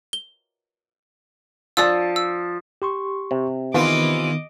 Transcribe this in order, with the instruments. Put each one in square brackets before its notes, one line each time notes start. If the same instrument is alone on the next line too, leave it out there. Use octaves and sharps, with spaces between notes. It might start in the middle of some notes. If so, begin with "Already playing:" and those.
[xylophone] G7
[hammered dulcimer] F3 A5 [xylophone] D5 E6
[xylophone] E6
[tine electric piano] G4 C6 C#6
[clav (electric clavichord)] C3
[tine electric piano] D#3 B3 [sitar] E3 F4 [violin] D#5 D6